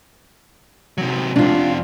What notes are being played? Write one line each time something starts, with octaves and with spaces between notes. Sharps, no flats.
C3 F#3
F2 C3 D4 F4